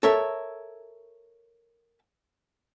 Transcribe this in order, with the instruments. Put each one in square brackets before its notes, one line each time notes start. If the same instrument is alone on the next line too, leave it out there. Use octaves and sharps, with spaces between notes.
[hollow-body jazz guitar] A4 A#4 C#5 E5